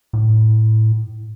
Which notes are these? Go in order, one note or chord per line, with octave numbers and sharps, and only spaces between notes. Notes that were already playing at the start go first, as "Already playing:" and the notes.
A2